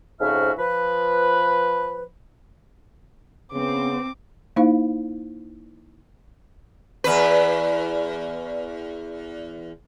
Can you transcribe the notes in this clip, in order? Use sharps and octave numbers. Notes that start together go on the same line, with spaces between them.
F2 G#2 C#3 F#4 E5 F6
F3 B4
C#3 B3 C4 D6
A#3 D#4 E4 C5 F5
E2 B4